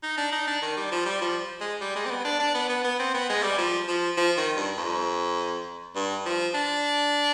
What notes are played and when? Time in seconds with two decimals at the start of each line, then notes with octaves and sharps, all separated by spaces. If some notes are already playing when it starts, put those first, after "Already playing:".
0.03 D#4
0.18 D4
0.32 D#4
0.47 D4
0.62 D#3
0.77 G3
0.92 F3
1.06 G3
1.22 F3
1.61 G#3
1.81 G3
1.96 G#3
2.06 C4
2.10 B3
2.25 D4
2.40 D4
2.55 B3
2.69 B3
2.84 B3
2.99 C4
3.14 B3
3.29 G#3
3.43 G3
3.58 F3
3.88 F3
4.17 F3
4.37 D#3
4.57 G2
4.77 F2
5.96 G2
6.26 F3
6.55 D4